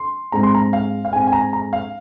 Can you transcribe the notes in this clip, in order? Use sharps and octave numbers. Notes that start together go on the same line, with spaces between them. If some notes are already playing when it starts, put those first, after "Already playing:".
Already playing: C6
G#2 G#3 C4 A#5
C6
A#5
F5
F5
G#2 G#3 C4 G#5
G#5
A#5
A#5
F5